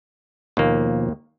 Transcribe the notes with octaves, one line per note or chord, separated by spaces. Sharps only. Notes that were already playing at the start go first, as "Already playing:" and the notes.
D#2 B2 F3 A#3